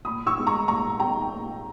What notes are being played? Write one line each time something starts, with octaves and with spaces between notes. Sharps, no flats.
A#2 B5 D#6
C#6 E6
G#3 B3
A#5 C#6
A#2 A#5 C#6
G#3 B3 G5 A#5
A#2